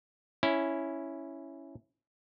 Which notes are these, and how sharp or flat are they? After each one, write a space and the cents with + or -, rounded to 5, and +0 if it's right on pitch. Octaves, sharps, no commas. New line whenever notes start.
C#4 +0 E4 +0